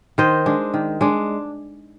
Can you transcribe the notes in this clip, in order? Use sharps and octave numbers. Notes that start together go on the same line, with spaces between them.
D#3 C5 D#5
G#3 D4
D#3
G#3 D4